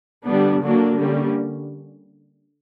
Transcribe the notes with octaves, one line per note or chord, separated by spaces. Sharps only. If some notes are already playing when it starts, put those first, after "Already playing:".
D3 G3 B3 D4
D3 F#3 A#3 D4
D3 G3 A#3 C#4